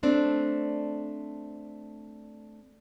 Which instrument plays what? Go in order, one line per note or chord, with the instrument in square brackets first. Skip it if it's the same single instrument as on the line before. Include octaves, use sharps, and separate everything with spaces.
[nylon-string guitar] A3 C4 D4